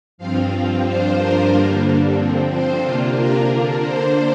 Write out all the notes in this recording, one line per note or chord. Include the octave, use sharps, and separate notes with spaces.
G2 F3 C4 F4 F5
G2 F3 D4 F4 C5
A#4
G2 D3 G3 A#3 D4
D3 F3 C4
C5
C3 A#3 D4 F4
A#4
D3 A#3 D4
C5